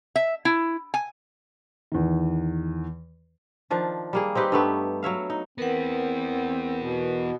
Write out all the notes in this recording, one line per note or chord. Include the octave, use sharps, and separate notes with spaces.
E5
E4
G#5
E2 D#3
D#3 F3 D4
G3 A#3 G#4
C4 D#4 G4 B4
G2 A3 B3
F#3 C#5 E5 F5
D#4
E3 B3 C4 A#4 B4 F#5
B2